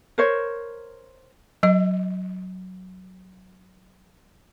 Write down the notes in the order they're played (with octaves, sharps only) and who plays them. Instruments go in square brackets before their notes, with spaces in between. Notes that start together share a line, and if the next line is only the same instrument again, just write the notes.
[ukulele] A#4 C5 C#5
[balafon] F#3 D#5